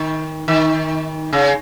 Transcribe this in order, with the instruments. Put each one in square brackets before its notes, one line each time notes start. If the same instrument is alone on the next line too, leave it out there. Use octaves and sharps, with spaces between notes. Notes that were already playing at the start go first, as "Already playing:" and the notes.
Already playing: [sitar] D#3
D#3
C#3